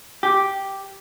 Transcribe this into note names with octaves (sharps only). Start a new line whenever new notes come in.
G4